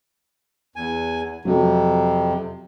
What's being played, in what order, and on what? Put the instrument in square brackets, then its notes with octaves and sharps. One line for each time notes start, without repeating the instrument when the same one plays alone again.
[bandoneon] E2 G#5
[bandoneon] F2 C3 [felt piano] F#3